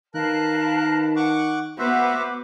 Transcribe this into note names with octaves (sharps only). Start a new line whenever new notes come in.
D#3 A#4 B4 F5 A5 F#6
F#5 C#6 D6
B3 F#4 C5 E5 D6